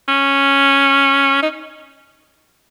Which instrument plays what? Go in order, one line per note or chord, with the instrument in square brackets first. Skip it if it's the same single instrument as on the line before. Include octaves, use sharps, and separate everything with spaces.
[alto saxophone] C#4
D#4